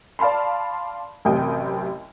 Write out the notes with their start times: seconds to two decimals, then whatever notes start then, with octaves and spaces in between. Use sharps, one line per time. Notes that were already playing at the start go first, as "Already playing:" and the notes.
0.19 D5 F5 A5 B5 C6
1.25 A1 F#2 C3 G5 D#6